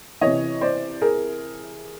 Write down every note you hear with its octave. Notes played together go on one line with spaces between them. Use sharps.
C3 E3 C#5 D#5
C5 D5
G#4 A#4